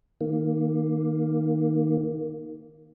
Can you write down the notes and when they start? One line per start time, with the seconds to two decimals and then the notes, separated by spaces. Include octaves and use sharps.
0.21 D#3 A#3